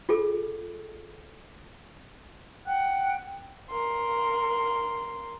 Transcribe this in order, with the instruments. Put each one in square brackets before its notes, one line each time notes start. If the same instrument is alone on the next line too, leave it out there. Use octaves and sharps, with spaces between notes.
[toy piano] F4 G#4 A4
[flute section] F#5 G5 F#6
[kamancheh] A#4 C6